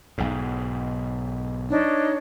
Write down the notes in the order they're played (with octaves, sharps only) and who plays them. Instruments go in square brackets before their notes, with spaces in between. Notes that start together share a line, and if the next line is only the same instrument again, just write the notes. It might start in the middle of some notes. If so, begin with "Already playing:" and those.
[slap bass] B1 G#2
[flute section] D4 D#4 C#5